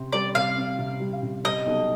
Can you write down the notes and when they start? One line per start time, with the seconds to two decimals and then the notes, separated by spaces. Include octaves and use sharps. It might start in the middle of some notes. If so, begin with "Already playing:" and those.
Already playing: C3 C4
0.13 G3 D5
0.35 C3 F5
0.57 C4
0.78 C3
1.00 G3
1.22 C3
1.44 G3 D#5
1.66 B1